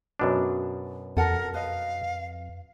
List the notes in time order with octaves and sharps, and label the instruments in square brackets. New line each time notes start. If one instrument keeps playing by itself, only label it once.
[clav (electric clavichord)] F#2 B2 D4
[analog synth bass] F2 [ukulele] A4 F#5 A5 [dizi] A#4
[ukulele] B4 D#5 [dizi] F5